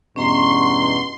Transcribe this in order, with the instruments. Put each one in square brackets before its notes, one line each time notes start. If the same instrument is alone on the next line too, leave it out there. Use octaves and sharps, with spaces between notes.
[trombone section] E2 G2 B2 [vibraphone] C#4 A#5 C#6 [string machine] C6